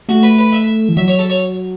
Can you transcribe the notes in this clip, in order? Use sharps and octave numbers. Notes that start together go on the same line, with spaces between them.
A3 F#4
B4
B4
E5
E3
F#3 E5
C#5
A4
C#5